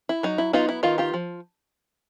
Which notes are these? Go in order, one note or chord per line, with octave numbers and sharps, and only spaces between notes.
E4
F#3 D#4
E4
B3 D#4 F4
E4
D#3 D#4 F4
F4 G4
F3